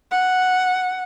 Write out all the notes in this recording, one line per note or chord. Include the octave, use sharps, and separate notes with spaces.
F#5